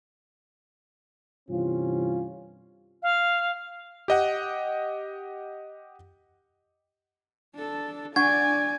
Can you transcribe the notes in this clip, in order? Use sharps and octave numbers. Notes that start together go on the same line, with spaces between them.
G2 C3 E3 C4 C#4 F4
F5
G4 D#5 F#5
D4 A4
D4 D5 F#5 G#5 C#6 G#6